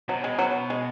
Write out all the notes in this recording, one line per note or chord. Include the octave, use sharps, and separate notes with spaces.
B2 F#3
G#3
F#3
G#3